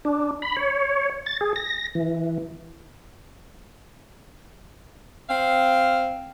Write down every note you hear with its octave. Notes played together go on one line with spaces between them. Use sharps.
D4
B5
C#5
A6
G#4
A#6
E3
C4 F5